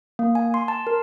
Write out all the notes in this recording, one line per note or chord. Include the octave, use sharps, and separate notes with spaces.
A#3
G#5
C6
A5
A#4